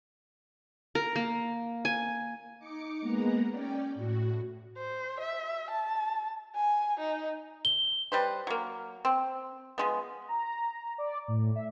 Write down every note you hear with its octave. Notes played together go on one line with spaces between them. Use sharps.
A#4
A#3
G#5
D#4 D6 C#7
G#3 A#3 B3 F#5 A#5
C#4 D5 G5
A2 F#4
C5
E5
A5
G#5
D#4
G7
G3 B4 C5
F#3 A#3
C4
F3 G#3 B3
A#5
D5
A2
E5